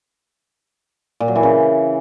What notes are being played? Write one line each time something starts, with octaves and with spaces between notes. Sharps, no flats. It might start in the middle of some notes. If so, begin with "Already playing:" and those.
A#2
F#3
E3
C#3